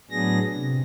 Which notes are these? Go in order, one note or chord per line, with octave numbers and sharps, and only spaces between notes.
A2 F#3 B3 D4 G#4 A#6
C3